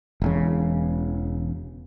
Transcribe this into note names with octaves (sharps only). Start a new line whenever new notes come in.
E1 E2 C#3